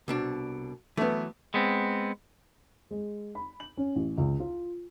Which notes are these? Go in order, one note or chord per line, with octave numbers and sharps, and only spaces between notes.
C2 B2 D4
E3 F#3 A3 B3
G#3 B3 C4
G#3
B5
F#7
C#4
A1
C#2
F4